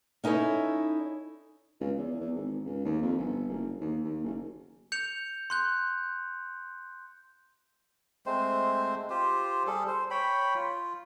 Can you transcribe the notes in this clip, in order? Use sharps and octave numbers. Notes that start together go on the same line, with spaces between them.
C#4 D#4 E4 A4 C#5
C#2
E2
E2
G#1
C#2
D#2
F2
G1
F#1
D#2
D#2
F#1
G6 C#7 F7
C6 F#6 G6
G#3 A3 C4 C5
F4 G4 C5
G3 G#4 A4
C5
C#5 G5 B5
F4